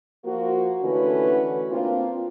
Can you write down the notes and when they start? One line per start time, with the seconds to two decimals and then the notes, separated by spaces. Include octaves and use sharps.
0.25 F3 A#3 F4 F#4
0.83 D3 E3 A3 C#4 F#4 B4
1.72 A#3 C4 D4 F4